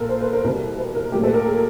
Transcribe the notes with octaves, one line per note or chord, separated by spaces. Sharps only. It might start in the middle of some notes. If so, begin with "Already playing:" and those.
Already playing: A#2 B3 A4 A#4
C5
B4
A#4
C2 B2 G3 B4
B4
A#4
A#2 F#3 A3 G4
A4
A#4
G#4